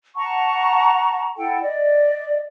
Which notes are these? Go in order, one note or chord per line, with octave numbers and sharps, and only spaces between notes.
F#5 A5 A#5 C#6
E4 A4 F#5 G5
D5 D#5